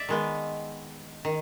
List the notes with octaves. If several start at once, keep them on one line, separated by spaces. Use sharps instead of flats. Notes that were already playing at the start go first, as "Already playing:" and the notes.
Already playing: D5 E5
D#3 G#3 B3
D#3